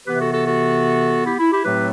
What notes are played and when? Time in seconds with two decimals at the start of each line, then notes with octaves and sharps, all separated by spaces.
0.06 C3 E3 B3 G4 B4
0.20 F#4 A4
0.33 F#4 A4
0.46 F#4 A4
1.26 E4 G4
1.39 E4
1.51 E4 G4
1.65 A2 F#3 A3 C4 G4 B4